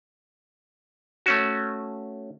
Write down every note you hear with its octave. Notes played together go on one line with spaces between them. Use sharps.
A3 C#4 F#4